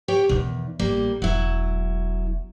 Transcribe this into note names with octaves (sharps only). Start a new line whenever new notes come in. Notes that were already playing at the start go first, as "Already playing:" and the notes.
G4 C#5 G5
E2 B2 D#3
A1 G3 A#3
E1 F#3 E4